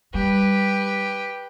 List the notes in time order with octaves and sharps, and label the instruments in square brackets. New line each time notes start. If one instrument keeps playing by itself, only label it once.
[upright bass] G3 [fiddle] G4 B4